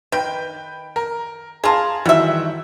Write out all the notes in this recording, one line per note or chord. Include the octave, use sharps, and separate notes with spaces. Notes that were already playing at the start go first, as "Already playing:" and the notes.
D#3 B4 G5
A#4
F4 G#4 A#4 A5
D#3 E3 G3 F#4 E5